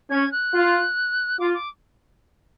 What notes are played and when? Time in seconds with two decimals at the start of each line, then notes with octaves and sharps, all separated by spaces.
0.10 C#4 G#6
0.32 F#6
0.53 F4
1.40 F4 D6
1.54 D6